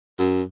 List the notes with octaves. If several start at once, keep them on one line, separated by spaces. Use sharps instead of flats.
F#2